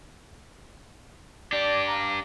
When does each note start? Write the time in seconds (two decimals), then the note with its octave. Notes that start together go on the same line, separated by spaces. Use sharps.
1.53 D4 G4 D5
1.87 F5 A#5